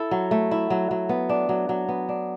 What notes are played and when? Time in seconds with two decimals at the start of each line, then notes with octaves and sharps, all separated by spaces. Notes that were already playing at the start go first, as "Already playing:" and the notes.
Already playing: E4 A4
0.11 F#3
0.31 A3
0.51 E4
0.70 F#3
0.91 F#3
1.09 B3
1.29 D4
1.49 F#3
1.69 F#3
1.89 B3
2.09 D4